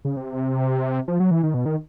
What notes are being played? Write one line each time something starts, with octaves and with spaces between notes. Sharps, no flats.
C#3
C3
F3
F#3
E3
D#3
B2
D#3